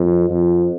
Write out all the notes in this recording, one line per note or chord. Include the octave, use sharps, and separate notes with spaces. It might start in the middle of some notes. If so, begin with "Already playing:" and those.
Already playing: F2
F2